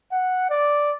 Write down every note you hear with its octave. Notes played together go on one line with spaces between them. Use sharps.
F#5
D5